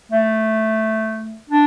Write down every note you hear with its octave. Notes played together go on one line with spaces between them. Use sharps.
A3
D4